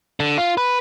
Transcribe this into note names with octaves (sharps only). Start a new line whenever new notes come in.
D3
F4
B4